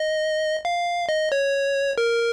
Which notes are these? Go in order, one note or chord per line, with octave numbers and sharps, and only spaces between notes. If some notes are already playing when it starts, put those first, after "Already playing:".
Already playing: D#5
F5
D#5
C#5
A#4